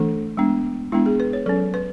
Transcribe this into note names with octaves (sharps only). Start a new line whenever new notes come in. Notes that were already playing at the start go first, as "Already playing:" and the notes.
Already playing: E3 A3 D4 A4
G#3 B3 D4
G#3 B3 D4 E4
G#4
B4
C#5
F#3 C#4 A4
B4